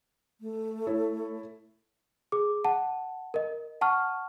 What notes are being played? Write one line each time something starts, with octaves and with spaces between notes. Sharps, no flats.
A3
E4 A4 C#5
G#4 D6
F#5 A5
A#4 D#5
F#5 A5 C#6 F6